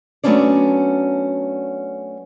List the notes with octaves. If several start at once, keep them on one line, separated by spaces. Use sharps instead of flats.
F#3 A3 B3 C#4 D4 D5